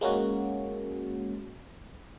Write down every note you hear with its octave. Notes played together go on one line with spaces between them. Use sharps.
G#3 A#3 C#4 F#4